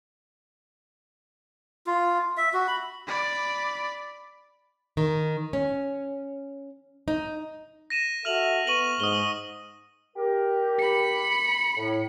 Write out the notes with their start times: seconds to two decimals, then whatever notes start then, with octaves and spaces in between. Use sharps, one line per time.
1.87 F4
2.37 E5
2.53 F#4
2.68 B5
3.07 D5 B5
4.97 D#3
5.53 C#4
7.08 D#4
7.90 A#6 D#7 E7
8.25 F#4 A4 E5 F6 F7 F#7
8.67 B3 C#6 D#7 F#7
9.00 G#2 D#6 G7
10.16 G4 A#4
10.79 B5 C#7
11.76 A2